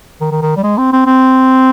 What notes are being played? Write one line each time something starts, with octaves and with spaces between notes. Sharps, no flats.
D#3
D#3
D#3
G3
G#3
C4
C4
C4